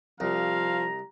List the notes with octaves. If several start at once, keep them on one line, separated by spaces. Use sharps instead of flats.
C2 F3 F5 A#5